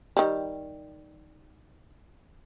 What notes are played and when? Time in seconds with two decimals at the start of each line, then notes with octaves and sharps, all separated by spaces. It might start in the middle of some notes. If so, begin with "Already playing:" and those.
0.17 D#3 G3